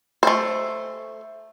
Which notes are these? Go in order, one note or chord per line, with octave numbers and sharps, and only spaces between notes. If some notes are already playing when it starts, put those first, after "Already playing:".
A3 C5